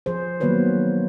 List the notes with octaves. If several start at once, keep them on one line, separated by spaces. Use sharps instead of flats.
F3 G#4 C5
D#3 F#3 A#3 B3 B4 C#5